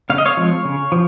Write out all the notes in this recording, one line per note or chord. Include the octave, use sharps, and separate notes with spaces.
C#3 F5
D#5
C#5 F5
F3 G#3 C4
C#3
F3